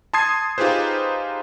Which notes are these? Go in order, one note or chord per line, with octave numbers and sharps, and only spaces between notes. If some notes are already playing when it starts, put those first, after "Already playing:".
A5 C6 D#6 G#6 C7
D#4 F4 G4 G#4 B4 C5